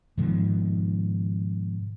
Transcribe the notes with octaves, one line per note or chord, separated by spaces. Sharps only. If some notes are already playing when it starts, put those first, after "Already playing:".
G#2 B2 D#3 F3